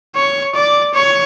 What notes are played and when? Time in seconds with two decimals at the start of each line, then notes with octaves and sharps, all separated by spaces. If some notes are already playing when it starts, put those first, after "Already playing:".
0.15 C#5
0.55 D5
0.94 C#5